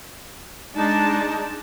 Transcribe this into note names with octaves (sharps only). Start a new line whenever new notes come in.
G#3 D4 D#4 A5